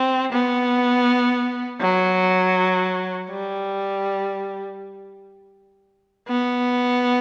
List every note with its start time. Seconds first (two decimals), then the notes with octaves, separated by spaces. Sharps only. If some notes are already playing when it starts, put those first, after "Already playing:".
Already playing: C4
0.33 B3
1.81 F#3
3.30 G3
6.28 B3